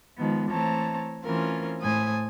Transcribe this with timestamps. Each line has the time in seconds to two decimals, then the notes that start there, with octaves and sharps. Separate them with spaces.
0.17 D#3 F3 G#3 B3
0.50 E3 A3 C4 C#5 A5 A#5
1.23 E3 A3 C4 C#4 F4 A#4
1.82 A2 C5 G#5 D#6